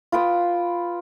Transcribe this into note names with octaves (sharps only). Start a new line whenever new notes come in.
F4 B4 G5 D#6